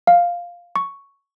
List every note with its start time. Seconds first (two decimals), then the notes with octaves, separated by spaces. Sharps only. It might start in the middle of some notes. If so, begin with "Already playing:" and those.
0.07 F5
0.76 C#6